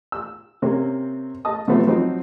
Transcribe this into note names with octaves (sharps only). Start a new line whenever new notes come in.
E6
C3 A#3 C4 C#4
D#5 A5 D#6
C3 F3 F#3 A3 B3 C4
F3 F#3 C4 D#4